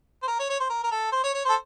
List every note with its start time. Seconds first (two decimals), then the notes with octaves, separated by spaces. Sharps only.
0.23 C5
0.27 A#4
0.39 C#5
0.50 C#5
0.60 C5
0.70 A#4
0.84 A#4
0.91 A4
1.12 C5
1.24 C#5
1.34 C#5
1.45 A4 C5